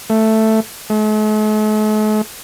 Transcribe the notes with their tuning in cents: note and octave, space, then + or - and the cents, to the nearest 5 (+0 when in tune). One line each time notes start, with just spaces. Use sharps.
A3 +5
A3 -45